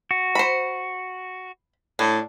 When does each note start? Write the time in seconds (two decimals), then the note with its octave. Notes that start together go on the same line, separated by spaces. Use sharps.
0.11 F#4
0.35 C5 B5
1.99 A2 D4